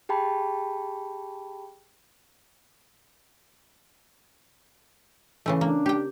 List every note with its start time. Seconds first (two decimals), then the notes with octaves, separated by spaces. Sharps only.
0.09 G4 G#4 G5 A5 B5
5.46 C#3 E3 A3
5.61 A#3 D4
5.86 G4 G5